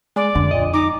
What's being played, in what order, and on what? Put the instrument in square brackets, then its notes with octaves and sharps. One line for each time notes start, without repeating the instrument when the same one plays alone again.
[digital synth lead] G#3 [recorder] D5
[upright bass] F2 [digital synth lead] D3
[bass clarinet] A#2 [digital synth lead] D#5
[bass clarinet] D#4 [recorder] D6